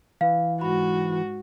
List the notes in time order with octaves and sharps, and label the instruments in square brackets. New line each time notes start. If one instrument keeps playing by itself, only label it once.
[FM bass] E3 [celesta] F5
[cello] G#2 F#4 [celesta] B5